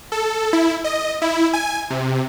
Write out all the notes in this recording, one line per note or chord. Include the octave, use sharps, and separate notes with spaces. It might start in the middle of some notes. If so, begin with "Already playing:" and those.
A4
E4
D#5
E4
G#5
C3